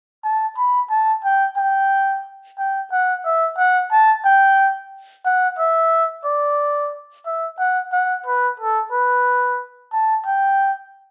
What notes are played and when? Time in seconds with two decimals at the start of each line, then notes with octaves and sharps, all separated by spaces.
0.24 A5
0.57 B5
0.90 A5
1.25 G5
1.57 G5
2.58 G5
2.92 F#5
3.25 E5
3.58 F#5
3.91 A5
4.25 G5
5.25 F#5
5.59 E5
6.25 D5
7.26 E5
7.59 F#5
7.93 F#5
8.26 B4
8.60 A4
8.92 B4
9.93 A5
10.26 G5